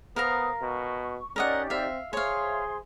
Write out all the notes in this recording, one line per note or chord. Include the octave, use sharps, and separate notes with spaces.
B3 A#4 C5 F5 A#5 D#6
B2 C#6
C#4 D#4 G4 A#4 D5 D#5 F#5
C4 E5 F5
G#4 C5 C#5 E5 F5 C6